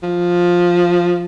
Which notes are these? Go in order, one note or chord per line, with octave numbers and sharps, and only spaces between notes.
F3